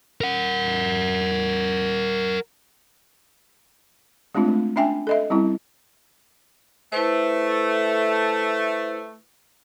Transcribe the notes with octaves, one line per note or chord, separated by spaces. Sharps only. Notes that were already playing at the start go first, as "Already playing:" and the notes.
A#4 F#5
G#3 A3 C4 D4 F4
A3
C#4 D4 E5 G5 G#5
A4 D#5 E5
G3 C4 C#4 E4
A3 E4 B4 C5